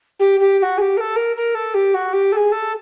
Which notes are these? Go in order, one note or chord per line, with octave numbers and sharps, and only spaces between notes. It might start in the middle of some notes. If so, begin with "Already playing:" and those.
G4
G4
G4
F#4
G#4
G4
A#4
A4
A#4
A#4
A4
G4
F#4
G4
A4
G#4
A4